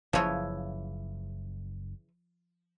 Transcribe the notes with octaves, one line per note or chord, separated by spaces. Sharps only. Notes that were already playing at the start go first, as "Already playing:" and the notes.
F#1 C#3 E3 F3 C#5